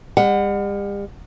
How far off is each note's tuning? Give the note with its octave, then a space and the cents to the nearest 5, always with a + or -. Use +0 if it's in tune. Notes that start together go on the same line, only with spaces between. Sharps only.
G3 +40 F#5 +0